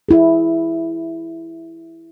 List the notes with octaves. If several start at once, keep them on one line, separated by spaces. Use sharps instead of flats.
E4 G#4